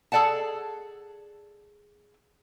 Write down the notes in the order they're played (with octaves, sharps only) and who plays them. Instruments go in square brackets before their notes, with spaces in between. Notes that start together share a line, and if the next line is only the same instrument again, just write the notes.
[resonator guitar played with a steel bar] G#4 A4 D5 F#5 A5